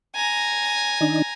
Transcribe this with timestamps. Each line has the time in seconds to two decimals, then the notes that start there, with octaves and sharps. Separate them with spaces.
0.15 G#5 A#5
1.01 D#3 D4 D#4